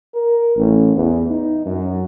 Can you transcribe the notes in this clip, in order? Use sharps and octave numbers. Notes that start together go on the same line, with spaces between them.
A#4
A1
E2
D#4
F#2